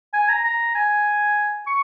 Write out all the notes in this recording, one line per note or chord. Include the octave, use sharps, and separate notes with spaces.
G#5
A#5
A#5
G#5
C#6